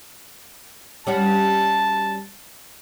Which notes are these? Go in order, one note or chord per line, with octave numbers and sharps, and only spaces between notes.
G3 C#4 F#4 A5